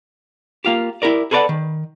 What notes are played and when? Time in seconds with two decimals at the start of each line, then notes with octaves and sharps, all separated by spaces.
0.65 A#3 F4 G4
1.02 E4 G4 A#4 D5
1.31 G#4 A4 B4 C#5 D5 F#5
1.49 D#3